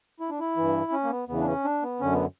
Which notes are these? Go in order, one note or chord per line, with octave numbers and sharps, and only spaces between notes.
E4
D4
E4
G2 E3
C#4
A#3
B3
E2 C#3 E3 B3
D4
C#4
D4
B3
F#2 D3 C#4
B3